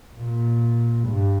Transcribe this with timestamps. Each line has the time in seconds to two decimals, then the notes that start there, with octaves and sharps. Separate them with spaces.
0.18 A#2
1.09 G2